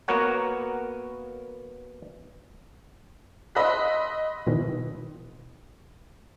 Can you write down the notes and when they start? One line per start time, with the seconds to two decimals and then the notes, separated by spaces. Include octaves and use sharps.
0.08 A#3 B3 F#4 A#4 C#5 F#5
3.55 D#5 B5 C6 E6 F#6 B6
4.47 B2 D#3 E3